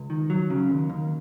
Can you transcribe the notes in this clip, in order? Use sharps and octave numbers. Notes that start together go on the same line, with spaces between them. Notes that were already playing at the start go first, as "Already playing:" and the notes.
Already playing: C#2
D#3
F#3
C#3
D#2
D#2